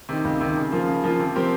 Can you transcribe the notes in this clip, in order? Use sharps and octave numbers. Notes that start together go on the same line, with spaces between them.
C3 D#3
C#2
C3 D#3
C#3
F3 A#3 F4
C#3
F3 A#3 F4
C3
F3 C4 G4 A#4